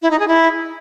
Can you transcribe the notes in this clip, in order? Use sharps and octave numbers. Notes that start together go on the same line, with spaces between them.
E4
D#4
G#4
E4